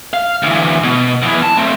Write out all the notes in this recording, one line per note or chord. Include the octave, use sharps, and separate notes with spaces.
F5
D2 E3
B2
E2 E3
A5
A3 C4